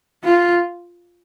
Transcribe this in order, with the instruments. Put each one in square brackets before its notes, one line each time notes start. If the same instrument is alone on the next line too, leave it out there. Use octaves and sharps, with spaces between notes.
[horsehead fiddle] F4